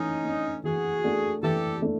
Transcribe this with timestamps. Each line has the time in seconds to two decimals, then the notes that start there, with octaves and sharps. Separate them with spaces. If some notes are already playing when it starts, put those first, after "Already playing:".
Already playing: E3 A3 C#4 D#4
0.25 A3 D4
0.64 E3 F#4 G#4
1.04 A3 D4
1.42 E3 G4 A4
1.82 A3 D4